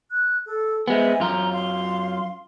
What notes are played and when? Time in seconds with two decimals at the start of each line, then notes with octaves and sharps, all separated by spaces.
0.10 F#6
0.46 A4
0.88 G#3 B3 C5 E5 G#5
1.20 F#2 F4 A#5
1.52 F5 C6